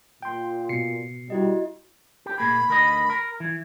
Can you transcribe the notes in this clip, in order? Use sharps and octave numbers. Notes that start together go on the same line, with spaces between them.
A#2 G5 C6
B2 C7 C#7
G3 E4 F#4 D#5
G4
A#2 A#3 G#4 B5
D2 A#4 D#5
A#4
E3